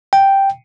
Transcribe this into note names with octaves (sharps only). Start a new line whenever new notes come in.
G5